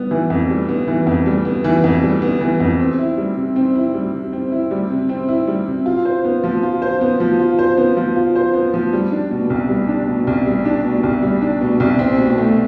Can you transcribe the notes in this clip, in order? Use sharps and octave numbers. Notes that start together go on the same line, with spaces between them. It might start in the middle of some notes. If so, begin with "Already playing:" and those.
Already playing: G3 B3
E3
F2
G3
B3
E3
F2
G3
B3
E3
F2
G3
B3
E3
F2
C4
E4
G3
C3
C4
E4
G3
C3
C4
E4
G3
C3
C4
E4
G3
C3
F4
C5
B3
F3
F4
C5
B3
F3
F4
C5
B3
F3
F4
C5
B3
F3
G3
D4
B2
C2
G3
D4
B2
C2
G3
D4
B2
C2
G3
D4
B2
C2
C4
B2
A3